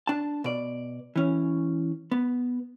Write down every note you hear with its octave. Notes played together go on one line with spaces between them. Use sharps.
D4 A5
B2 D5
E3 C#4
B3